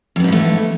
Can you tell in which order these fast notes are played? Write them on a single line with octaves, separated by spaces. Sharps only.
F2 B3 G#2 E3 A3